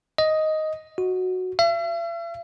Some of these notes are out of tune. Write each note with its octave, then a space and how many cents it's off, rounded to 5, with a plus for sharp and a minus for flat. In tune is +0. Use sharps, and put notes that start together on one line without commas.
D#5 +5
F#4 -5
E5 +45